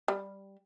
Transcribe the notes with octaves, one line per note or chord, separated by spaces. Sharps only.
G3